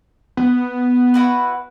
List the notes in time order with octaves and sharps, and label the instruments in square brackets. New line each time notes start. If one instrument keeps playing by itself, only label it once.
[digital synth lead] B3
[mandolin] E4 F#4 B4